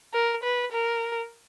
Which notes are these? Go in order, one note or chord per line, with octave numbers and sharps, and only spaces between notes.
A#4
B4
A#4